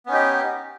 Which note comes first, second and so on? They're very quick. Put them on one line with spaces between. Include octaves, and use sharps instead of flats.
B3 C#4 D#4 G4